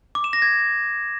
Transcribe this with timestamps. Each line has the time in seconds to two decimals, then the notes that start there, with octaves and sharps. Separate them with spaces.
0.15 D6
0.24 E7
0.33 A#6
0.42 G#6